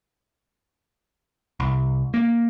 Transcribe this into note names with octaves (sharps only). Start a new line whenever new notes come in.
C2
A#3